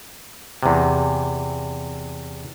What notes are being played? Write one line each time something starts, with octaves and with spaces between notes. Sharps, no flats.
E2 C3